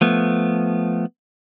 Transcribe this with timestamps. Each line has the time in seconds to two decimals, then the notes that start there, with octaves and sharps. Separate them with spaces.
0.01 F3 A3 B3